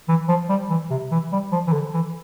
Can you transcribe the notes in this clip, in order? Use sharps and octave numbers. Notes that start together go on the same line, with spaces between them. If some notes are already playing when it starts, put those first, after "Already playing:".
E3
F3
G3
E3
C3
E3
G3
F3
E3
D3
E3